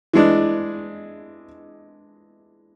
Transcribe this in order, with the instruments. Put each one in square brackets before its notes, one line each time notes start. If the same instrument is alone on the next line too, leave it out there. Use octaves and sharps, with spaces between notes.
[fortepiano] E3 G#3 D4